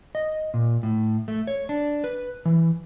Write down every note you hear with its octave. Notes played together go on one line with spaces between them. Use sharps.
D#5
A#2
A2
A3
C#5
D4
B4
E3